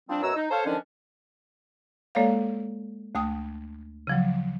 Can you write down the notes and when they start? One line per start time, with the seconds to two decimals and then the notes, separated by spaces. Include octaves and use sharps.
0.09 F3 G3 C4 D4
0.22 F#2 B2 F#4 C#5 A#5 E6
0.35 D#4
0.51 A4 C5 C#5 F5
0.66 D3 D#3 F3 C#4 D4
2.15 G#3 A#3 A4 C#5 D5 F5
3.15 D2 A3 G5 D#6
4.07 C#3 F3 F#3